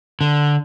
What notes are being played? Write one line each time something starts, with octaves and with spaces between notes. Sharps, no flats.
D3